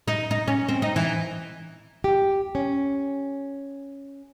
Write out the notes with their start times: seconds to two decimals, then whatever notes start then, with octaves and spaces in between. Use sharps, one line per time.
0.08 D#4
0.31 D#4
0.47 C#4
0.69 C4
0.82 D#4
0.96 E3
2.04 G4
2.55 C#4